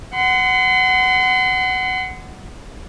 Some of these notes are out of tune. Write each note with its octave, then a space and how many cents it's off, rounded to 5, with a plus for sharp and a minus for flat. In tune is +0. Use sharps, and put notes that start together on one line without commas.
F#5 +10 C6 -40